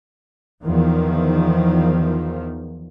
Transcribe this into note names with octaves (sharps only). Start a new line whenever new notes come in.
E2 D#3 F3